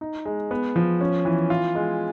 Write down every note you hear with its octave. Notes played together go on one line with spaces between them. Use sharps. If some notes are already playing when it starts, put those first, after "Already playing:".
D#4
G#3
B3
F3
C#4
E3
F4
G#3